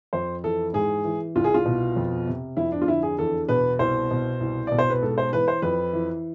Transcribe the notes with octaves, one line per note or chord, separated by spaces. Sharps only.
F2 C5
E3 A4
G#2 G#4
E3
C2 F4
G#4
F4
B2
F2
C3
F2 E4
D4
F4
D3 E4
G#4
E2 A4
B2 B4
C2 C5
B2
C2
B2 D5
C5
B4
G#2 A4
C5
E3 B4
C5
F2 B4
E3